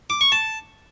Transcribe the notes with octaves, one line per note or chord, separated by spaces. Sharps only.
D6
C#6
A5